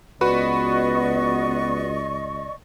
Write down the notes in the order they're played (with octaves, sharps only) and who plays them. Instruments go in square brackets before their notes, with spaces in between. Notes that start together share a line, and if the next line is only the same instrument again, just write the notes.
[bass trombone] C#2 [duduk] B3 [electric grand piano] F#4 B4 B5 [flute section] D5 D#5 C#6